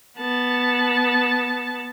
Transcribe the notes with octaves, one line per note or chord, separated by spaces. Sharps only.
B3 A5